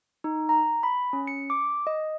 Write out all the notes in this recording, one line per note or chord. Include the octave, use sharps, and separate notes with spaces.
D#4
A#5
B5
C#4
C#7
D6
D#5